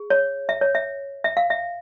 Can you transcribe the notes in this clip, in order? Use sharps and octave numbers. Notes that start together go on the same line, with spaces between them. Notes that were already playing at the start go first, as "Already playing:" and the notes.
Already playing: G#4
C#5
E5
C#5
E5
E5
F5
E5